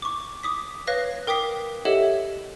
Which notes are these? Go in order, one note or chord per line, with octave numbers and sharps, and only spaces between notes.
C#6 D6
D6 D#6 B6
B4 C#5 F5 F#6 A#6
A#4 G5 D6 D#6 B6 C7
G4 A4 C#5 D#5 E5 F#5